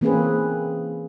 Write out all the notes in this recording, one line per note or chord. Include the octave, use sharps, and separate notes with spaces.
E3 A#3 C4 C#4 G#4 B4